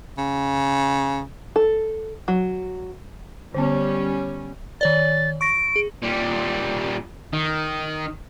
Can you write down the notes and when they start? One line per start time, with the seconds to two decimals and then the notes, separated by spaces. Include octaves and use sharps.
0.18 C#3
1.56 A4
2.28 F#3
3.54 D3 G3 B3 C#4
4.81 D#3 C#5 D5 A6
5.41 C#6 A#6 D7
5.76 G#4
6.02 A#2 G3
7.33 D#3